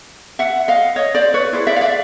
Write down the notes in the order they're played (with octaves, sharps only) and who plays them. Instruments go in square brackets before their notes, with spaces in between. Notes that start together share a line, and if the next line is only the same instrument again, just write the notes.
[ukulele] E5 F#5
D#5 F5
C#5 D#5
C5 D5
B4 C#5
E4 G#4 B4 C5
D5 E5
F5
D5 E5